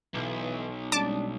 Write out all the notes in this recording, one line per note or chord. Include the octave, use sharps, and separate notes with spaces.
B1 E3
G3 G#3 C#4 D4 A5 D6